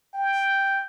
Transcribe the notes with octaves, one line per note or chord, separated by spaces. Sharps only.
G5